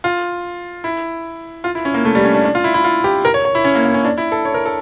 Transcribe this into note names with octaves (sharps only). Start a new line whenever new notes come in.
F4
E4
F4
E4
C#4
A#3
A3
G3
C#4
D4
D4
F4
E4
E4
F4
G4
A#4
C#5
C#5
E4
C#4
A#3
A#3
C#4
D4
E4
A4
C#5
A#4
A4